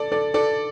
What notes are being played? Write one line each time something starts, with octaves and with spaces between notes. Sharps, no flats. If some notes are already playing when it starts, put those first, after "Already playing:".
Already playing: A4 D5
A4 D5
A4 D5